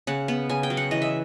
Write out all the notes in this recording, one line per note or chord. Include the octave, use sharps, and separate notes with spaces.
C#3 F#5
B3
C#3 G#5
G5
F#3
F#5
E3 D#5
E5